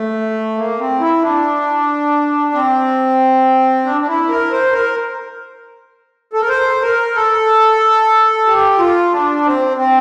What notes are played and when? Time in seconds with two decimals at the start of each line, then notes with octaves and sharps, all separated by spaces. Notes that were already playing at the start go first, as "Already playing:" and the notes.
Already playing: A3
0.57 A#3
0.79 C4
1.00 E4
1.22 D4
2.54 C4
3.85 D4
4.01 D4
4.08 E4
4.29 A#4
4.51 C5
4.73 A#4
6.33 A4
6.41 A#4
6.48 C5
6.82 A#4
7.15 A4
8.46 G4
8.78 F4
9.12 D4
9.45 C4
9.77 C4